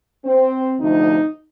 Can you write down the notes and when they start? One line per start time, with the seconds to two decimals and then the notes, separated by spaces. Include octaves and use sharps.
0.25 C4
0.79 D2 C3 F3 D#4